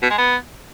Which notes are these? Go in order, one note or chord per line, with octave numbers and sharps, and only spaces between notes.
B2
G#3
B3